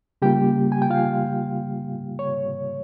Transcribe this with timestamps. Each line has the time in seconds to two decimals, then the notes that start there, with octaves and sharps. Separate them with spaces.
0.22 C#3 G3 A#3 F4 G4 G5
0.72 G#5
0.82 G5
0.90 F4 F5
2.19 C#5